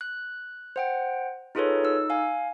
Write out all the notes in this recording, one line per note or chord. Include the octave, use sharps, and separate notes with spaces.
F#6
C5 F#5 G5
D#4 F4 G#4 A4 B4 C#5
D#4 E6
F5 G#5